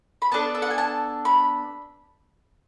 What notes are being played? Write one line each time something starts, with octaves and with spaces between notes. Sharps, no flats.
B5
B3 D4 A4 A5
E5
F#5
G#5
A5
B5